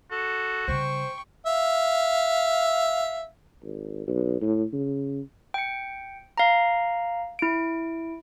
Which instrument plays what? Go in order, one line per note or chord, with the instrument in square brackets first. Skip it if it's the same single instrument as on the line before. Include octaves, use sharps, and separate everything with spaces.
[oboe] F#4 [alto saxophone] A4
[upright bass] C#3 G3 [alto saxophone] C5 [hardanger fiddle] G5 C#6
[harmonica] E5 F5
[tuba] G#1
B1
A2
C#3
[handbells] G5 C#7
F5 A#5
E4 D7